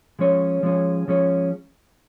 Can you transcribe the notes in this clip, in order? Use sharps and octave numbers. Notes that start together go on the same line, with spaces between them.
F3 G#3 C#4 G#4 C#5
F3 G#3 C#4 G#4 C#5
F3 G#3 C#4 G#4 C#5